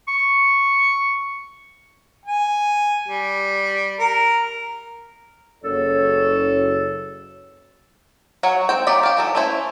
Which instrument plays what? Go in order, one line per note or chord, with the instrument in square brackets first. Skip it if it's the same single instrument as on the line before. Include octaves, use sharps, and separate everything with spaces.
[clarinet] C#6
[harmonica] G#5
G3
A#4
[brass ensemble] F#1 F#2 C#5 [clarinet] A4
[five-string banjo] F#3 C#5 F#5
C4 G5
F#3 A#3 G4 D5 B5
G4 F5
E3 F#3 A4
A3 C#4 E4 C5